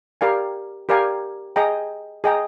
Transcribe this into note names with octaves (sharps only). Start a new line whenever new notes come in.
G4 A#4 D5 F5 G#5
G4 A#4 D5 F5 G#5
G#4 D#5 G5 A#5
G#4 D#5 G5 A#5